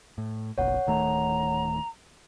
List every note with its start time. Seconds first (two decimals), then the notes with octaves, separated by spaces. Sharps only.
0.18 A2
0.58 F#1 B1 C#5 F#5
0.87 D1 D#3 A3 A#5